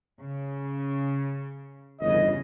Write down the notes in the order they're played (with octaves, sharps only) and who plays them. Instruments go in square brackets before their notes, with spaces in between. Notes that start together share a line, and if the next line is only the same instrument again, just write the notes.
[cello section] C#3
[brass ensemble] G1 D#5 [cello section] E2 C#3 E3